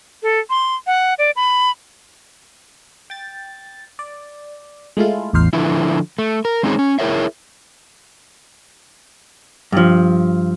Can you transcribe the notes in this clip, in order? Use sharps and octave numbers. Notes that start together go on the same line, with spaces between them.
A4
C6
F#5
D5
B5
G5 A6
D5
G#3 A3 E4 F4
A1 E2 D#4 C5 F5 C7
D3 F3 E4
A3
A#4
G#3 C4 C#4 D#4 F#4 G#4
C#4
E4 G#4 A#4 C#5 E5
G2 F3